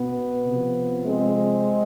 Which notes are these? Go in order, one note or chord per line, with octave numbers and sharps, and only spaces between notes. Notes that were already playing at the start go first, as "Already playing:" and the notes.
Already playing: B2 B3
C3 F3
G#3 C4